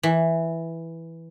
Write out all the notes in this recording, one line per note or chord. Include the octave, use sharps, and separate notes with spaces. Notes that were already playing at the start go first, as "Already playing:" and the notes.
E3